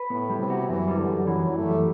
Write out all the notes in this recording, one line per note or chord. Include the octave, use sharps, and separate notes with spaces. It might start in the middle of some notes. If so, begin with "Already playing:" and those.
Already playing: B4
A2 B3
G3
C3
F#4
F#2 E3
G3
D3
F#2
E3 F#3
F#2
A3
G3